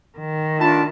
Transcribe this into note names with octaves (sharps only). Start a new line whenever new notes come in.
D#3
A3 D4 F4 A5 B5